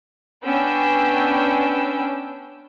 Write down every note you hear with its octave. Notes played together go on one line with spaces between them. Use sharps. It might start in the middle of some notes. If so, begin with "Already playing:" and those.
B3 C#4 D4 G5 E6